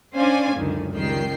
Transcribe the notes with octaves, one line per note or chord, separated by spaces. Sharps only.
C#4 D4 C5 D5 F5 G#5
C#2 F#2 D3 D#3
C#2 D#3 G3 G5 C7